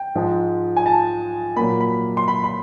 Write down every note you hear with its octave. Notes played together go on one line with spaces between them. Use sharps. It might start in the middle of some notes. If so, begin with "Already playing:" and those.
Already playing: G5
G#2 F3 G#3
G#5
A5
A#2 F#3 A#3 B5
B5
C6
B5
B5